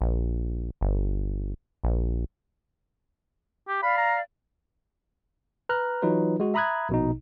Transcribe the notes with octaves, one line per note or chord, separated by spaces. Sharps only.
A#1
G1
A#1
G4
D5 F5 B5
A#5
B4 A#5 F6 F#6
E3 F#3 D#4 F4 B4
G#3 F#4
E5 A#5 B5 D#6 F#6 G#6
A#1 B2 D#4